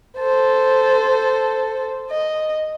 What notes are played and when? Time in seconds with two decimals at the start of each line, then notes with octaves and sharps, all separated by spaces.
0.18 A4 C5
2.10 D#5